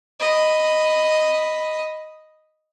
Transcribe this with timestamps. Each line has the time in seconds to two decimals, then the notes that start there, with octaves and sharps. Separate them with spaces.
0.20 D#5 B5